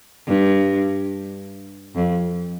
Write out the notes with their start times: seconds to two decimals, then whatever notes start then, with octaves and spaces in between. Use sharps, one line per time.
0.27 G2
1.95 F2